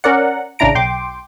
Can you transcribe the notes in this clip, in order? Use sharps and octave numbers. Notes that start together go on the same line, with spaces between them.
C#4 A#4 D5 F#5
A1 C#3 D4 E4 A#5 D7
B1 G5 C6 D6